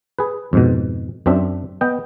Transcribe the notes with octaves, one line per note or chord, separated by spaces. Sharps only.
G#4 B4
F2 G#2 B2
F#2 C4 D4 E5
B3 D#5 G5